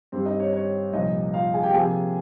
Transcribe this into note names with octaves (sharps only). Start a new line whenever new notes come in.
G2 G3 C4 C5
D#4 D#5
C#5
C#5
C2 A#2 F3 D#4 D#5
F4 F5
G#4 G#5
G4 G5
C3 F3 A#3 G#4 G#5